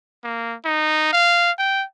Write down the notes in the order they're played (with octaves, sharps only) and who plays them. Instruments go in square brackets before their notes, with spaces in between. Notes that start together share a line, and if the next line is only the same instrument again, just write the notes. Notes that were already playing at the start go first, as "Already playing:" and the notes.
[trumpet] A#3
D#4
F5
G5